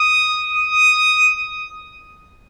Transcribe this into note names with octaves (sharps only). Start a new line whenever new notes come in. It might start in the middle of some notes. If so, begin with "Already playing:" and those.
Already playing: D#6
D#6